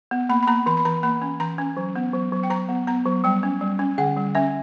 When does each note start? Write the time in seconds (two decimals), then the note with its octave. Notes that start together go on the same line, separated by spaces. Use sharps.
0.11 B3
0.29 A#3 B5
0.43 B5
0.47 A#3 A#5
0.66 E3 B5
0.77 B5
0.85 E3 A#5
1.03 A#3 B5
1.22 C#4
1.40 E3 A#5
1.58 C#4
1.77 F#3
1.96 B3
2.13 F#3
2.32 F#3
2.43 G5
2.50 F#3 A#5
2.69 B3
2.87 B3 A#5
3.06 F#3
3.24 G3 G5
3.43 C#4
3.61 G3
3.79 C#4
3.98 D3 F#5
4.17 G3
4.35 C#4 E5